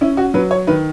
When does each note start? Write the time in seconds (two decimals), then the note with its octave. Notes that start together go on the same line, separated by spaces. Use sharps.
0.01 C#4 E4
0.17 F#4
0.34 F#3 B4
0.51 C#5
0.67 D#3 B4